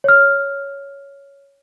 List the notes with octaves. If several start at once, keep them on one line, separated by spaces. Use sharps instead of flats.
C#5 F6